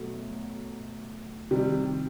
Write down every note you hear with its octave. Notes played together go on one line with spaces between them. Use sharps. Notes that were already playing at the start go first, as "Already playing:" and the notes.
Already playing: B2 F#3 A3
C3 D#3 G3